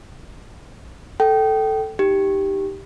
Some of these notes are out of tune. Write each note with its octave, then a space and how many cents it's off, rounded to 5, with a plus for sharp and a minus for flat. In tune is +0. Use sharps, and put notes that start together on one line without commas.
A4 +0 G5 -20
D#4 +10 G4 +0